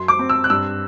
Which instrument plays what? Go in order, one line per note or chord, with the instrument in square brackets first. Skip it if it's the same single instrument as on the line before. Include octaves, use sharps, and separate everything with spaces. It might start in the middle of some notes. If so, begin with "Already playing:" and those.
Already playing: [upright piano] F#2 C6
D6
C4
E6
F#6
G2 E6